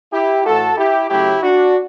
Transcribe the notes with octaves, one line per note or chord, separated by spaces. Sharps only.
E4 G4
A2 E3 A3 F#4 A4
E4 G4
C#3 F#3 A3 E4 G4
D4 F#4